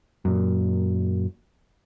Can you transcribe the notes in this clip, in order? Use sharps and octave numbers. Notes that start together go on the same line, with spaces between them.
F#2 A#2